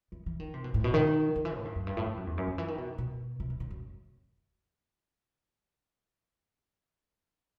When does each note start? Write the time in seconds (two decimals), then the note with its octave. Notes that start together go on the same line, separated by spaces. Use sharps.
0.12 E3
0.26 E3
0.40 D#3
0.54 C3
0.64 B2
0.74 A2
0.84 B2
0.94 D#3
1.36 D#3
1.45 E3
1.55 A2
1.65 G2
1.76 F#2
1.87 G2
1.97 A2
2.06 G2
2.17 F#2
2.27 E2
2.38 F#2
2.47 D#3
2.58 E3
2.68 D#3
2.78 B2
2.98 B2
3.40 C3
3.50 E3
3.60 D#3
3.71 F#2